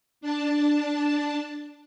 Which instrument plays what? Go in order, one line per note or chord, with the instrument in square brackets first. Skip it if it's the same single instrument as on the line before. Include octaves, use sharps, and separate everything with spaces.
[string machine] D4 A5